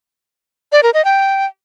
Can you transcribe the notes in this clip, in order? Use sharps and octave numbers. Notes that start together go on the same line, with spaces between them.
D5
A#4
D#5
G5